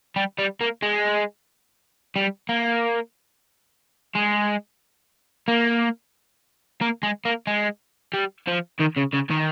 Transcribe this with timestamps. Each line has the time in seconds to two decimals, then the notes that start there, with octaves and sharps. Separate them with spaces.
0.16 G3
0.39 G3
0.61 A#3
0.83 G#3
2.16 G3
2.49 A#3
4.16 G#3
5.48 A#3
6.81 A#3
7.03 G#3
7.25 A#3
7.47 G#3
8.13 G3
8.47 F3
8.79 D#3
8.96 C#3
9.13 C#3
9.30 D#3